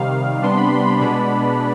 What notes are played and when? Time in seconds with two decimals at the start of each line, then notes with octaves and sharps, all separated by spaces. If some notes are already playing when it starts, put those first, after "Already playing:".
Already playing: C3 D#3 G3 F5
0.42 C3 G3 B3 D4 C6
0.57 B5
0.72 C6
0.87 B5
1.01 B2 G#3 B3 D4 B5